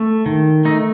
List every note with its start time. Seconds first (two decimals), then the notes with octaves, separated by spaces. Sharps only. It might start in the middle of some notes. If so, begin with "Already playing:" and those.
Already playing: A3
0.26 D#3
0.65 A3 D#4